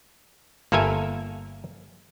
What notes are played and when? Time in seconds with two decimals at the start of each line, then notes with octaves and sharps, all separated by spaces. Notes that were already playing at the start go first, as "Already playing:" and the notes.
0.72 G1 A#3 A4 A#4 E5 G#5